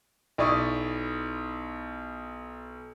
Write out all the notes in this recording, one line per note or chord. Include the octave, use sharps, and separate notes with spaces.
B1 E4 D5 C#6 D#6